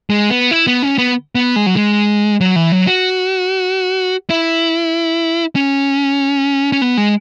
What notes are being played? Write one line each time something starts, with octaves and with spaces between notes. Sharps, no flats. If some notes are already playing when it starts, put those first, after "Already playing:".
G#3
B3
E4
B3
C#4
B3
B3
G#3
F#3
G#3
F#3
E3
F#3
F#4
E4
C#4
C#4
B3
G#3